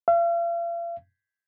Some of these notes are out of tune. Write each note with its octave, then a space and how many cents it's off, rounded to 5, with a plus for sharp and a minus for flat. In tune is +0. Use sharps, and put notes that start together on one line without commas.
F5 -45